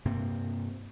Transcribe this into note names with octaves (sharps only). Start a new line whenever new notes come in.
G2 C3 A#3 C4